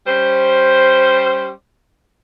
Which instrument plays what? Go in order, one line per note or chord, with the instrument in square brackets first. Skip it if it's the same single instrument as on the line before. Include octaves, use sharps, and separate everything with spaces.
[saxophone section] G3 C#4 C5